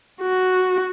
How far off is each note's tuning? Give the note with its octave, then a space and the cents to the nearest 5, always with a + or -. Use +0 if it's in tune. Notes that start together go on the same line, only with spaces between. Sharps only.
F#4 +0